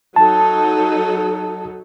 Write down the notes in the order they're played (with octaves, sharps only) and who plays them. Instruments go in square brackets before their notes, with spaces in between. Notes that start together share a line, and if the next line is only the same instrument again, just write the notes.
[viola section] F#3 D#4 A4 [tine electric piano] A5